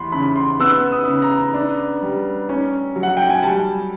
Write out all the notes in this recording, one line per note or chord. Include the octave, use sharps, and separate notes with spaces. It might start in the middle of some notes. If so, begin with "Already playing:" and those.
Already playing: E2 B5 C6
C#3 B5
C6
B3 E6
D#6
C#3
A#5
D4
G3
C#4
F#3
F#5
G5
G#5
G3 A5